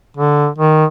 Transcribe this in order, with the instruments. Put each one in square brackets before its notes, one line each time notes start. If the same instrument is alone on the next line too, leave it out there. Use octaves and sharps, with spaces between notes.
[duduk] D3
D#3